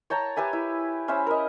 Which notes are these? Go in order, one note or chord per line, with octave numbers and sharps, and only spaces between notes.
C#5 G5 A5 A#5
G4 B4 E5 G#5
E4
C#4 C5 E5 B5
A#4 D#5